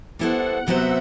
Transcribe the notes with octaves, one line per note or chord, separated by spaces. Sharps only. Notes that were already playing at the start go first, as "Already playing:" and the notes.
G3 B3 E4 A4 C5 F#5
C3 F#3 B3 F#4 C5 E5